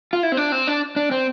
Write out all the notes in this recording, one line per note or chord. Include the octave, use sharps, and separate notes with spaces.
F4
E4
C4
D4
C4
D4
D4
C4